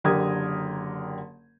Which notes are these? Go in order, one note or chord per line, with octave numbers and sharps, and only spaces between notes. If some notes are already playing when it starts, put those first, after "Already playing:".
F#1 D3 G4 A#4 D#6 G#6